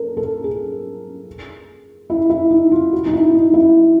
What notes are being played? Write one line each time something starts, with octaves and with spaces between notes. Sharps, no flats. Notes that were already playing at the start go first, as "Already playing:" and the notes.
Already playing: A4 A#4
A4
G#4
E4
E4
D#4
F4
F#4
D#4
E4
D#4
E4